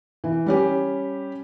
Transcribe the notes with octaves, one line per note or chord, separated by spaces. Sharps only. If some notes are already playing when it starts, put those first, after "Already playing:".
E3
G3 C#4 G4